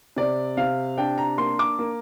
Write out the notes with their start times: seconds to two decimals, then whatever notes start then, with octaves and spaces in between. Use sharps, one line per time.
0.16 C3 D5
0.57 C3 F5
0.97 D4 G5
1.18 A#5
1.38 A#3 C6
1.59 D6
1.79 A#3